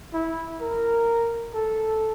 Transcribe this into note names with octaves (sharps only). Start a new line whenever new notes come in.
E4
A#4
A4